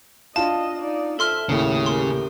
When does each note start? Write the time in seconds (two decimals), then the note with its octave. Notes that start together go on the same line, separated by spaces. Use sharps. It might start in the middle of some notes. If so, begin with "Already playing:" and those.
0.36 D4 F4 D#5 F5 A5
0.81 D#4 D5
1.19 F3 A4 E5 C6 F6
1.49 D#2 A2 C#3 A#3 G4
1.86 G4 A#4 C6